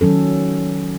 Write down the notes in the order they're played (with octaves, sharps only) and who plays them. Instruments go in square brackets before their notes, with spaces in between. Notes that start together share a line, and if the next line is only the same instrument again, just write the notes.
[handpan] D#3 F#3 C#4 A4